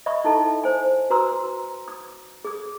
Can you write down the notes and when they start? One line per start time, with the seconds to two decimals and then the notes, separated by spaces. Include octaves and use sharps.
0.06 D#5 E5 B5 C#6 D#6
0.25 D#4 E4 A4 A5
0.64 C5 G#5
1.10 F#4 B4 A#5 C6 D#6 E6
1.88 D#6
2.45 G#4 D#6